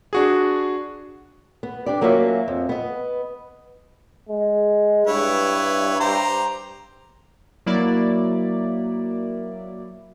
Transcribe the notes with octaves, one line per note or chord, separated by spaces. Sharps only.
D4 F#4 G#4
B3
D4 G4 D5
F#3 A#3 C#4 F4 F#4 E5
F2
B3 D#5
G#3
G2 E4 B4 C#5
G4 C5 A#5
F#3 A#3 E4 D5